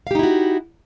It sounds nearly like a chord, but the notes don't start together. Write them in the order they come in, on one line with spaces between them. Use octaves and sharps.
F5 G4 D#4 E4 F#4